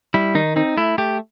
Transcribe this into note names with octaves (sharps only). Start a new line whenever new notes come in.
G3 E4
D#3 D#4
C4 D#4
A3 E4
A3 G4